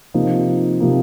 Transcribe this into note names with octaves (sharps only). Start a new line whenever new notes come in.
C3 F3 A#3 D#4
C3 F3 A#3 D#4